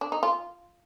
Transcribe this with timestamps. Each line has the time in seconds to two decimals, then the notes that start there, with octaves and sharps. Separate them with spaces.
0.01 D4
0.12 D#4
0.23 F4